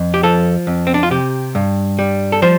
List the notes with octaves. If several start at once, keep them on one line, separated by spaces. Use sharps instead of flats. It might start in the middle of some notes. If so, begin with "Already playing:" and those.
Already playing: F2
G4
F3 A4
F2
C4
D4
F4
C3 G4
G2
G3
A4
F3 C5